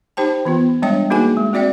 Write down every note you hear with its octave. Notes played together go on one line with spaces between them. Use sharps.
D#4 G4 C5 G5 A5
E3 B3 F4
G3 G#3 D4 C#5 D#5 G5
A#3 D#4 F#4 G#4 B4 G#5
G#3
C4 F#4 D5 E5 G5